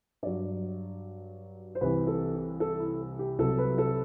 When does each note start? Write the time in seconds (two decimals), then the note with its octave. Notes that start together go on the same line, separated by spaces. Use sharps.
0.23 G2 F#3 D5
1.75 C5
1.81 C2 C3 E3 B4
2.07 A4
2.34 G4
2.60 A4
2.79 E4
3.19 G4
3.39 C2 C3 F#3 A4
3.58 B4
3.78 A4